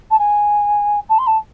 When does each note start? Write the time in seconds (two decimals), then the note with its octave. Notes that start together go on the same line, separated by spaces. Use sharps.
0.11 A5
0.19 G#5
1.09 A5
1.19 C6
1.27 A5